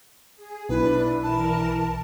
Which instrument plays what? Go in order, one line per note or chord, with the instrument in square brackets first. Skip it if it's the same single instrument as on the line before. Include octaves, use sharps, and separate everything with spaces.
[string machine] G#4
[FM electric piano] B1 [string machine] D4 [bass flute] E4 [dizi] B4
[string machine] E3 A#4 [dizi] A5